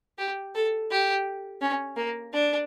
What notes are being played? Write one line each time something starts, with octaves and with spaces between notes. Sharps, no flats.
G4
A4
G4
C#4
A#3
D4